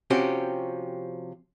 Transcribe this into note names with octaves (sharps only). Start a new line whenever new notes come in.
C3 F3 C4 C#4 F#4 G4